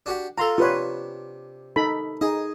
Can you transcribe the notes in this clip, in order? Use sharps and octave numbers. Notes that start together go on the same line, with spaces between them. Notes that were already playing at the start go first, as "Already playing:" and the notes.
D4 F#4 G4
F4 A4 A#5 C6
C3 D4 F4 B4 C#5
D#4 A4 B5
D#4 G#4 D#5